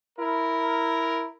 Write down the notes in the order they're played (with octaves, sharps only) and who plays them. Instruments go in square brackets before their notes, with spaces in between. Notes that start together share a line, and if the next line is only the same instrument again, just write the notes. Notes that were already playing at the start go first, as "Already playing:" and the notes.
[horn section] E4 A#4